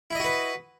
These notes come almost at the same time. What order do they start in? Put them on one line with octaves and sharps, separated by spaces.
E4 D#5 F#4 B4